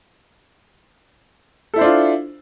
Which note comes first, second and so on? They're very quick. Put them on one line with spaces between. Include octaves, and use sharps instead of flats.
A4 E4 C5 D4 F4